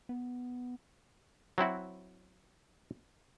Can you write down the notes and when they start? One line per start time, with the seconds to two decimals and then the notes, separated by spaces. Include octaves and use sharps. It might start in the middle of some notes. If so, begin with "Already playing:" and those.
0.09 B3
1.58 F#3 C4 E4 F#4